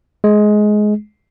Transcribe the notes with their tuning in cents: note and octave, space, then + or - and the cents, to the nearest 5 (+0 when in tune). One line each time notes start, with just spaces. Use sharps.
G#3 +15